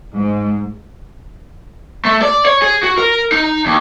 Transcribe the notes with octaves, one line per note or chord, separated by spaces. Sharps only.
G#2
A3
D5
C#5
G#4
F#4
A#4
D#4
D#2